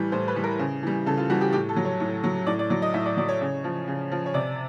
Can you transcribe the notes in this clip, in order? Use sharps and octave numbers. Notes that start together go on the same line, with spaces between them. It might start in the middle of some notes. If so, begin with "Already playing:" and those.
Already playing: A2 E3 G3
A2 C5
B4
E3 G3
A#4
C#3
E3 G3
C#3 A4
F4
E3 G3 F#4
G4
A2 G4
A4
F#3
C#5
A2
F#3
A2 D5
D5
F#3 D5
D#5
A2 E5
D5
F#3 D5
C#5
C#3
F3
C#3
F3
C#5
C3 D5